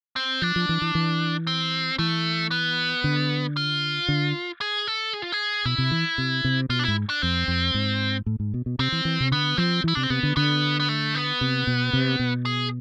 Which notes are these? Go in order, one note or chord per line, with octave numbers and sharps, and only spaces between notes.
C4
F3 D4
F3
E3
E3
E3
C4
E3 A3
B3
D3
F4
D3
G#4
A4
G#4
F4
G#4
B2 E4
C3
E3
C3
C3
B2 F4
D4
G#2 E4
D4
F2 C4
F2
G#2
A2
G#2
B2
B2
C3 C4
E3
E3
C3
D3 B3
F3 C4
E3 E4
C3 D4
C4
C3 B3
D3
D3 B3
B3
A3
B3
C3
B2
C3
B2
G#4